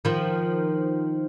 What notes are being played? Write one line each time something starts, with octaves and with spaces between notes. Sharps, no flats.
D#3 F3